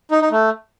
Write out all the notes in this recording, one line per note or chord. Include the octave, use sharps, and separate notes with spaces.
D#4
D#4
A3